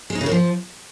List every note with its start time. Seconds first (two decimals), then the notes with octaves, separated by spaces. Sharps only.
0.10 G#3
0.15 D#4
0.21 C#3
0.26 D#3
0.31 F3